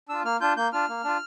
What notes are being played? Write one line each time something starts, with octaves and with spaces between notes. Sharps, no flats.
D4 F4 E6
A#3 F6
D4 F4 G6
A#3 G6
D4 F4 F6
A#3
D4 F4